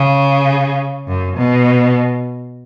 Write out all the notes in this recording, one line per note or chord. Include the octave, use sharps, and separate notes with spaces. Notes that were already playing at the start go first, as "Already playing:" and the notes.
Already playing: C#3
F#2
B2